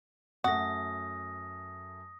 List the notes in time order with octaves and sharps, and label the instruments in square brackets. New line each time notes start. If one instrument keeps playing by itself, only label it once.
[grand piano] F#2 A3 [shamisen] F#4 [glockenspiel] D#6 A#6